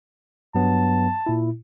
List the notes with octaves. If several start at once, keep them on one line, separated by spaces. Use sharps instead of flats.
G2 F#3 B3 A5
A#2 E4